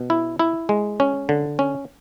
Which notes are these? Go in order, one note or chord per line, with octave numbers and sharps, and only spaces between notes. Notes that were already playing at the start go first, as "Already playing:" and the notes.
Already playing: B2
E4
E4
G#3
C#4
D3
C#4